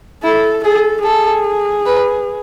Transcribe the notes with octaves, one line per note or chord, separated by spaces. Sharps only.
E4 A4
G#4 A4
G#4 A4
B4